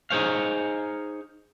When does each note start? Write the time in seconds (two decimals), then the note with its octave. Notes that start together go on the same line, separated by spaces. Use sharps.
0.10 D#4 G#4 C5 C#5 F5